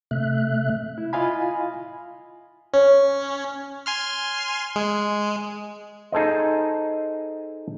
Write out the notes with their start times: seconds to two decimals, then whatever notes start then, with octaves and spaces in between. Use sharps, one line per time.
0.11 C3 A3 E5 F#6
0.98 E4
1.13 E4 F4 D#5 F5 G#5 B5
2.74 C#4 C#5
3.86 G#5 C6 F6
4.76 G#3
6.12 D#4 G#4 A4 C5 D#5